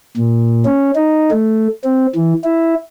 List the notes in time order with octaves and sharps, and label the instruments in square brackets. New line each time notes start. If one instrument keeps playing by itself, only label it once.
[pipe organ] A#2
C#4
D#4
A3
C4
E3
E4